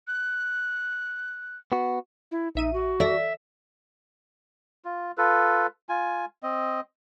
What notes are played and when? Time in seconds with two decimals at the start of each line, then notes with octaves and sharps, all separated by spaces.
0.07 F#6
1.72 B3 F#4
2.31 E4
2.55 A#1 D#4 E5 D#7
2.73 F#4
3.00 A4 D5 E5 A#6
4.85 F4
5.18 F4 A4 B4
5.89 F4 G#5
6.43 C4 D#5